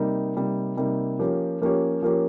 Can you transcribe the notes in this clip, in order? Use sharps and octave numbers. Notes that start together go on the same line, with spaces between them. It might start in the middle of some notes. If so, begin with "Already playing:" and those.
Already playing: C3 G3 A#3 D#4
C3 G3 A#3 D#4
C3 G3 A#3 D#4
F3 A#3 C#4 G4 C#5
F3 A#3 C#4 G4 C#5
F3 A#3 C#4 G4 C#5